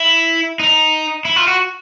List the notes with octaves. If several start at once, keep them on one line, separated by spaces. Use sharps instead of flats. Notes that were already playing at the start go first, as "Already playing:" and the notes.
Already playing: E4
D#4
E4
F4
F#4